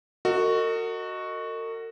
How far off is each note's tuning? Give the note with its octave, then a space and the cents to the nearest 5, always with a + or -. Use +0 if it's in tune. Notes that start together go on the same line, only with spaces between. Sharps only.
F#4 +0 A#4 -45 D#5 +0